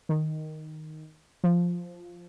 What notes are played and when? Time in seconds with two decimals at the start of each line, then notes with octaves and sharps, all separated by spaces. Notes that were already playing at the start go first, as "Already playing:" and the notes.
0.09 D#3
1.44 F3